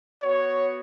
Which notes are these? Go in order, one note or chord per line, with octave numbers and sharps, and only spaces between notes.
B3 F#4 C#5